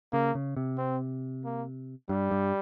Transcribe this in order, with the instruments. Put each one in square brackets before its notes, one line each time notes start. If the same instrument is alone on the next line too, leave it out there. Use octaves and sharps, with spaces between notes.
[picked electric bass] C#3 [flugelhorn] A#3
[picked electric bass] C#3
C3
[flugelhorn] C4
A#3
[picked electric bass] G2 [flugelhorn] G3
[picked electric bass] G2